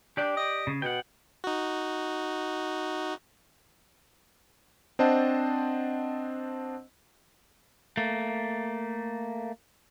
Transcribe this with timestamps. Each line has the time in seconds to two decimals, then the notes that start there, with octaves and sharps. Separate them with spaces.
0.17 D4 G4 D5 G5
0.36 D#5
0.67 C#3
0.82 B2 F#5 G5
1.44 D#4 F#4
4.99 C4 D4 C5 D#5 F#5 A5
7.97 A3 A#3